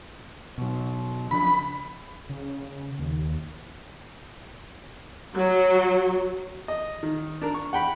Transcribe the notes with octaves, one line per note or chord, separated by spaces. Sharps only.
B2 F#3
C#3 F3 D4 B5
C#3
D#2
F#3
D#5
D#3
D4 A#4
C#6
F#5 G5 B5